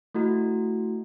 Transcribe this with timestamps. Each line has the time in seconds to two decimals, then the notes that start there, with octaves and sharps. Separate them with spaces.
0.15 A3 E4 F#4